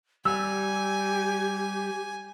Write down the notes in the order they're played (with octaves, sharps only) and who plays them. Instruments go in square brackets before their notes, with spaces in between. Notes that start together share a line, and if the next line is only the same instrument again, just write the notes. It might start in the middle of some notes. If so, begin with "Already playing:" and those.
[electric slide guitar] G3 [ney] G4 [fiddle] G#5 [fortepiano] E6